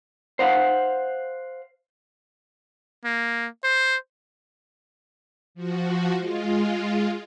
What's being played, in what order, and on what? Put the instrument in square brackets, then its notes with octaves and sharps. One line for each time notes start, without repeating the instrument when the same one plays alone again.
[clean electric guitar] C5 F5 F#5
[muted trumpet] A#3
C5
[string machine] F3 F#4
G#3 F4